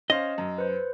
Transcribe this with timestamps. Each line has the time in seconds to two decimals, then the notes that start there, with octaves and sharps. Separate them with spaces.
0.10 C#4 C5 D#5 F5
0.38 F#2
0.58 B4 C5